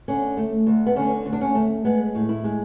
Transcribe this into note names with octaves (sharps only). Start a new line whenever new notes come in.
D3 C#4
A3
D2
B3
D3 C#4
D2
D4
C#4
A3
G#3 B3
A2
E4
G#3